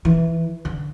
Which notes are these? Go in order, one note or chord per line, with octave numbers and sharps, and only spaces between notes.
E3
D3